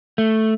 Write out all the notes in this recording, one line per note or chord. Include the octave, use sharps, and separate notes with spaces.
A3